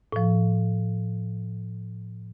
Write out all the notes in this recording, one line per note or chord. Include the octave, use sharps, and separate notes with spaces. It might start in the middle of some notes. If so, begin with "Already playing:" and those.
A2 F3